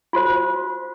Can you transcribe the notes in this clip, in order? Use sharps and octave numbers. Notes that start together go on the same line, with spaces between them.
F4 F#4 C5